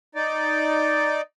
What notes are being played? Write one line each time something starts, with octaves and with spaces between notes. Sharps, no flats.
D#4 D5